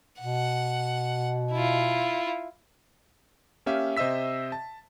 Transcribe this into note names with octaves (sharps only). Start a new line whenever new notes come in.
B2 F#5
E4 F4
A#3 C#4 G4 E5 F5
C3 C5 D#5 E5 E6 B6
A5